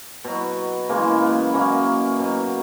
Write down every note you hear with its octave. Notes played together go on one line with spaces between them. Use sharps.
B2 F#3
C#3 E3 G#3 A#3
B3
B2 F#3 A#3 C#4
B2 F#3